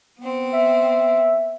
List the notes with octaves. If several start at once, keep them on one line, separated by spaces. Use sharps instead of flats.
B3 C4
E5